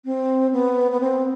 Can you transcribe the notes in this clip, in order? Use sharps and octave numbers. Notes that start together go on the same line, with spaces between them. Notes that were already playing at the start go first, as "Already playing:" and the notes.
C4
B3
B3
C4